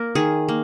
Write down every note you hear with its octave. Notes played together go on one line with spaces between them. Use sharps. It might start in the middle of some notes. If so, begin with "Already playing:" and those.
Already playing: A#3 A#4
D#3 G#4
A#3